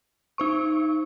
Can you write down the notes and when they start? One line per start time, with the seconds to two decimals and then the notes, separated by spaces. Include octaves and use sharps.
0.38 D#4 C5 C#6